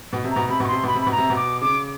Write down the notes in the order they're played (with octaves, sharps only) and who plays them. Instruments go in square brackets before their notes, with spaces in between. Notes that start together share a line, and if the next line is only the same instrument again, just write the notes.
[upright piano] B2
C3
[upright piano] B2 [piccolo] A#5
[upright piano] C3 [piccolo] B5
[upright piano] B2 [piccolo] C#6
[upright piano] C3 [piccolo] C6
[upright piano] B2 [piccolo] B5
[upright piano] C3
[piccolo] B5
[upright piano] B2
[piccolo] A#5
[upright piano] C3
B2
[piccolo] D6
[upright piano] C#3 [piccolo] D6